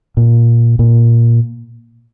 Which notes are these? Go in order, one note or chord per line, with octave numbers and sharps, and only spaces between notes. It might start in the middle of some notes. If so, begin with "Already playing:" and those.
A#2
A#2